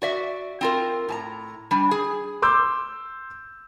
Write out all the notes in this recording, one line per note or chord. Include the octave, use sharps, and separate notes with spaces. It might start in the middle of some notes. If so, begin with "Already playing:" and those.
F#4 D5 E5
C4 F4 A#4
A2 A5 A#5
G3 D4
G#4
C6 D6 E6 G6